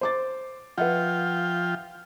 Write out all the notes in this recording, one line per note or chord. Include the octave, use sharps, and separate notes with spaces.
C5 D6 A6
F3 F4 B4 E5 F#5 G5